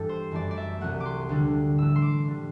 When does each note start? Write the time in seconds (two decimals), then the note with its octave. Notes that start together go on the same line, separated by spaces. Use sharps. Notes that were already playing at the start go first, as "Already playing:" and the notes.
Already playing: G2 E3 G3 A3 G4 A4
0.09 C5
0.31 F#2 E3 A3 D5
0.51 D5
0.57 E5
0.81 C2 C3 F#3 A3 F#5
1.00 D6
1.06 C6
1.29 D2 D3 G3
1.78 A2 E3 A3 E6
1.96 C6
2.02 D6
2.28 D3 G3